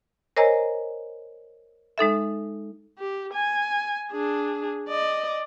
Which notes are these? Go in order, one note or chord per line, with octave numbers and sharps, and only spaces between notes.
A#4 C5 C#5 D#5 G#5 A#5
G#3 D#4 A4 E5
G4
G#5
D4 G#4
D5 D#5